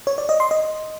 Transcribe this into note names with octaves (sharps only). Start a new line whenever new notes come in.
C#5
D5
D#5
C6
D#5